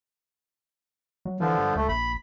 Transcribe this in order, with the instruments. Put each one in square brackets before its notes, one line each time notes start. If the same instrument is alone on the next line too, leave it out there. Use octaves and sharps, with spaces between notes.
[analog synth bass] F#3
[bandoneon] D3 F3 [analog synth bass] E3
[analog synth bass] G2
[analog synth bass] C#2 [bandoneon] A3
[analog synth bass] A#1 [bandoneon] B5